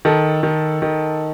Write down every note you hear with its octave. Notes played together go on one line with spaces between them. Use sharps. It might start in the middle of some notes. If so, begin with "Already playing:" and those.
D#3 A4
D#3
D#3